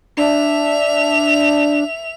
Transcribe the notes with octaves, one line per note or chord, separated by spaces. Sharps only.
D4 E5 F7